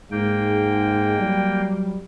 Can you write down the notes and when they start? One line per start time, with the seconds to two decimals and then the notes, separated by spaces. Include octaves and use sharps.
0.11 G#2 G#3 A#3 G5
1.19 F#3 G3